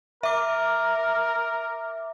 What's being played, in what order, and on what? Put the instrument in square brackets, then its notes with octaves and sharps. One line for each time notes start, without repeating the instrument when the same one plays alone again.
[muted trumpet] A#4 [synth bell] E5 D6